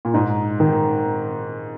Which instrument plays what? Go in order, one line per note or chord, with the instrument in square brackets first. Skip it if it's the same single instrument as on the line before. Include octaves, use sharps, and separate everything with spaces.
[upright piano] A#2
[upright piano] G#2 [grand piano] D#4
[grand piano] D#3